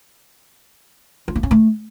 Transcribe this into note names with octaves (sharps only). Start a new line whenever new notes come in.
F4
A#3
C#4
A3